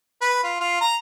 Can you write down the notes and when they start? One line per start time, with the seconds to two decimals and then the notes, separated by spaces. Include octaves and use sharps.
0.21 B4
0.43 F4
0.60 F4
0.81 A#5